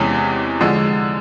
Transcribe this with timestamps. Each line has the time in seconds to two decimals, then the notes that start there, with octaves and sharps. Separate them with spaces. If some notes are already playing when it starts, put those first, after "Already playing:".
Already playing: E2 C3 E3 G#3 C#4
0.61 D3 F3 G#3